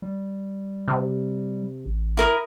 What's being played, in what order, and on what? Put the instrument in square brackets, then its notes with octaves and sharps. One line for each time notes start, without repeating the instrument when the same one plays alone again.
[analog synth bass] G3
[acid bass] C3
[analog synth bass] A1
[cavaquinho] E4 A#4 D#6